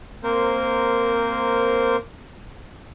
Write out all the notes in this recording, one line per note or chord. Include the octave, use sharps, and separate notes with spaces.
A#3 C4 A#4 C5